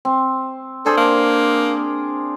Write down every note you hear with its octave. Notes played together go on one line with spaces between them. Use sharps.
C4
D4 G#4 A4 C5
A#3